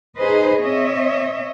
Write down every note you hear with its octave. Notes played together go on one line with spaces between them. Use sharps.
D#4 G#4 B4 C5 D#5
C4 C#5 D#5 E5